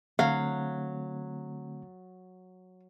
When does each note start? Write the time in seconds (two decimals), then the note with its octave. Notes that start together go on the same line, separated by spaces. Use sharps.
0.19 D3 F#3 A3 C4 F5